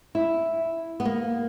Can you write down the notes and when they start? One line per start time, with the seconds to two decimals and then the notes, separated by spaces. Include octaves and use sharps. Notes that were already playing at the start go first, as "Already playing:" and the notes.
0.15 E4
1.00 B3
1.05 A#3